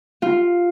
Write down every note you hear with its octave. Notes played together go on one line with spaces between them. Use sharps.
F4